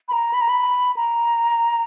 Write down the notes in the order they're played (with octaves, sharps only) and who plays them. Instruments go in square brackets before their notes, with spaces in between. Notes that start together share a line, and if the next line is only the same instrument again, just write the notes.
[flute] B5
A#5
B5
A#5
B5
A#5